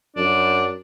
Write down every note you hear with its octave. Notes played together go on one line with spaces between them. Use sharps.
F#2 D4